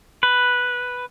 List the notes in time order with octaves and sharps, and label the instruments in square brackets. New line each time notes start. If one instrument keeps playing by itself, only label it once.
[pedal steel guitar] B4